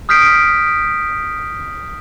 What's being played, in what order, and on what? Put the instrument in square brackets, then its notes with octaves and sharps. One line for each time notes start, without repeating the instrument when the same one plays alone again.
[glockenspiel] D#6 F6 G6 B6 C7 D7